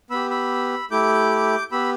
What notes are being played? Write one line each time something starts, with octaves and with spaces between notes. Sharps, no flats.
B3 G4 B5 E6
B5 E6
A3 E4 G4 D6 G6
B3 G4 B5 E6